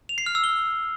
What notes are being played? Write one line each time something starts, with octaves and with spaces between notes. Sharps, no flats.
F7
C7
F6
E6
G7